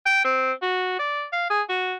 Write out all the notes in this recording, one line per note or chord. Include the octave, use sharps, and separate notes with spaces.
G5
C4
F#4
D5
F5
G#4
F#4